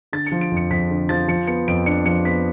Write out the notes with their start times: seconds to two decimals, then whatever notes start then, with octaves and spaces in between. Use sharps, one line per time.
0.13 D3 A6
0.27 C#7
0.32 F3
0.41 D7
0.52 F2 C#7
0.70 F2 B6
0.90 D3
1.09 F3 A6
1.28 F3 C#7
1.47 B3 C#7
1.68 F2 D7
1.86 D4 C#7
2.06 F3 C#7
2.25 B3 B6